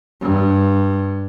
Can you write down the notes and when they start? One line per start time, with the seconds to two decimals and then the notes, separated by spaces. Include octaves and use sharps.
0.21 G2